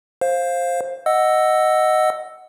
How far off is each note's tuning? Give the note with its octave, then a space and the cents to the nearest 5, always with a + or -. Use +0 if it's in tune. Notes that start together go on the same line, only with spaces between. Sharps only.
C5 +15 F5 +0
D#5 +0 F#5 +0 E6 +0